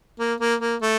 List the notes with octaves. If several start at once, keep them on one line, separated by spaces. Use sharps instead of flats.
A#3
A#3
A#3
A3